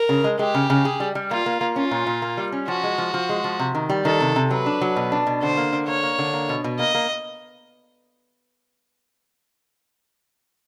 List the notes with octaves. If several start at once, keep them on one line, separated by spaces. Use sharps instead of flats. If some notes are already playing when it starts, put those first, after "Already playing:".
Already playing: A#4
C#3
G#3
G#3 G4
C#3
C#3
G#4
G3
G3
A#3 F4
A#3
A#3
C#4 F4
A#2
A#2
A#3
G3
C#4
F3 F#4
G#3
F3
F3
G#3
F3
C3
D#3
G3
D#3 A4
C3
C3
F#3 B4
D4
F#3
B2
D4
B2
D3 C5
A#3
D3
A#3 C#5
A#3
D3
A#3
B2
B2
A#3 D#5
A#3